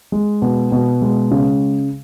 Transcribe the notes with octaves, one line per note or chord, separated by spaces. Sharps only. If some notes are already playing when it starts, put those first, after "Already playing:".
G#3
B2
B2
G#3
C#3